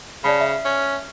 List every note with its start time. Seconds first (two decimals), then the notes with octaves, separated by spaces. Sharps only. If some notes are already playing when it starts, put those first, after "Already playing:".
0.24 C#3 D5 A5 B5
0.41 E5
0.65 C#4